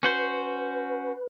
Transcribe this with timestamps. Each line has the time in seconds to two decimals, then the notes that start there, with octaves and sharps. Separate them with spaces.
0.03 C#4 F#4 B4 C5